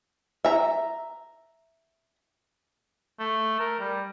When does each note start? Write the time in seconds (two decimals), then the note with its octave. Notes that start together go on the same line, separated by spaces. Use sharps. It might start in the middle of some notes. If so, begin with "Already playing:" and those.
0.45 E5 A#5
3.20 A3
3.60 A#4
3.79 G3